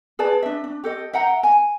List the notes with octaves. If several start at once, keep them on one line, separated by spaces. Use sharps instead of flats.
G#4 B4 D5 A5
D4 E5
D4
G4 A4 D#5
E5 F#5 G5 A#5
G#5